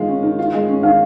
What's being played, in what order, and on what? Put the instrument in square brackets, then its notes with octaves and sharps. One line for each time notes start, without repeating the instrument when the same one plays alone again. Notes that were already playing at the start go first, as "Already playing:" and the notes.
Already playing: [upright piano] D#3 G#3 F4
C#4
D#3
F4
G#3
C#4
[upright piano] D#3 [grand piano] F5